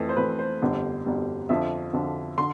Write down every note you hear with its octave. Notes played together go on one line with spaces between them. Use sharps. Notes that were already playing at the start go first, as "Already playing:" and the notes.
Already playing: F2 E3 A3
C5
F2 E3 A3 B4
C5
G1 F2 D3 G3
G1 F2 D3 G3
F2 D3 F3 E5
F2 D3 F3
D3 C6